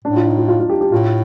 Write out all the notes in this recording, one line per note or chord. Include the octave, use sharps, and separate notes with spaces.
A2 D4
F4
D#4
F4
F4
F4
G4
G4
A2 F4